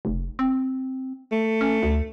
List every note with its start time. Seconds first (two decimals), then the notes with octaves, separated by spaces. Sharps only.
0.05 F1
0.39 C4
1.32 A3
1.61 C#4
1.83 D2